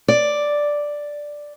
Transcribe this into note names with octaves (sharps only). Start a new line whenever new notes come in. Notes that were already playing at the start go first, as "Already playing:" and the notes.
D5